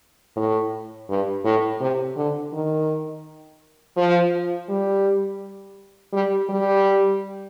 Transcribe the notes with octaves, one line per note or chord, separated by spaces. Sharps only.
A2
G2
A2
C3
D3
D#3
F3
G3
G3
G3